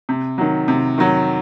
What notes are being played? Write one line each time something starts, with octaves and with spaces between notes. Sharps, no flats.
C3
D#3 F#3
C3
D#3 F#3